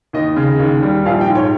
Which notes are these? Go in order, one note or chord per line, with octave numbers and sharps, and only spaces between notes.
D#2 D#5
C#3
D#2
G3
A#1 F5
G5
G#2
C#5